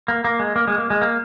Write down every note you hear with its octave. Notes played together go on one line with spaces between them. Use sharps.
A#3
A#3
G#3
A#3
G#3
A#3
G#3
A#3